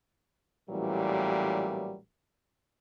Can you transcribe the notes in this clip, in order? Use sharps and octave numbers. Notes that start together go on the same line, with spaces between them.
A1 A#2 E3 F#3 G3